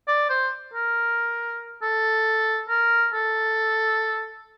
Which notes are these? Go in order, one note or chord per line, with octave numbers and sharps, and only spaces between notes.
D5
C5
A#4
A4
A#4
A4